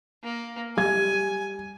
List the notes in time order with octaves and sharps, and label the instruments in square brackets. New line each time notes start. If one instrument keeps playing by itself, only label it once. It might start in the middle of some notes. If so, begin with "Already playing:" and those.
[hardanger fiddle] A#3
[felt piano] G3 G#6 [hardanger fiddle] G#5